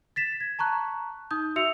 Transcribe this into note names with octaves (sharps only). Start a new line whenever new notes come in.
A6 B6 E7
G#6
A5 A#5 C#6 F#6
D#4 D#6 G6
F#4 E5 E6 C#7 F7